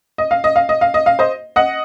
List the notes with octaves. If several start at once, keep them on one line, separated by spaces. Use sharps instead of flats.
D#5
F5
D#5
F5
D#5
F5
D#5
F5
C5 D#5
D#5 F#5